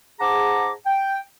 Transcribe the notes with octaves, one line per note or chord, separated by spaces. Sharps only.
G#2 G#4 F#5 A5 A#5 D6
G5